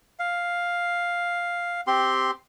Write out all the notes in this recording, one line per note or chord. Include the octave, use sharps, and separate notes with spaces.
F5
C4 G4 C6